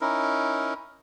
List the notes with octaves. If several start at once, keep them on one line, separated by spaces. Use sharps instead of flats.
C#4 D#4 E4 A#4